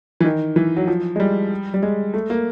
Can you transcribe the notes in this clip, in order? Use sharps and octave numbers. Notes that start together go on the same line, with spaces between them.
E3
D#3
E3
F#3
F3
G#3
G3
G3
G#3
A3
A#3